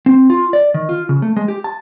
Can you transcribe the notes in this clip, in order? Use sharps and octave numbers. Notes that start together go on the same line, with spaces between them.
C4
F4
D5
D#3
F4
C#3
A3
G#3
G4
A5